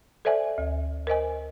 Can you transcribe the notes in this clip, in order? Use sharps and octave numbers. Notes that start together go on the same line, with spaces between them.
A4 C5 D5 E5 G#5
D2
A#4 C5 D#5 G#5